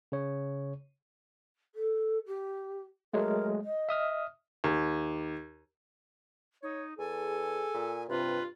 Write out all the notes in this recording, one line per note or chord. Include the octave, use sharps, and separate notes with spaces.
C#3 C#5
A4
G4
F#3 G#3 A3 A#4
D#5
E5 D#6 F6
D#2
D#4 C#5
E2 G#4 A4 G#5
A#2
G2 C3 F4 B4